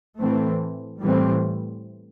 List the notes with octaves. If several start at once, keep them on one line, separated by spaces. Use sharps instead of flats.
A2 E3 A3 C4
A2 E3 G3 C4